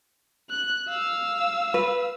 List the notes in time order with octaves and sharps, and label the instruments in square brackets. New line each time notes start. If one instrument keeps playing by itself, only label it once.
[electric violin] F#6
F5 E6
[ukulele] B4